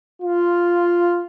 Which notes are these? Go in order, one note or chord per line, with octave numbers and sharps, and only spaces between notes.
F4